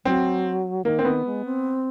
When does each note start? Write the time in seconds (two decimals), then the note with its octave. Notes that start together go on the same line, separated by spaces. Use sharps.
0.05 F#3 C4
0.85 D#3 A#3
0.99 C4
1.04 D#3 B3
1.25 G#3
1.45 C4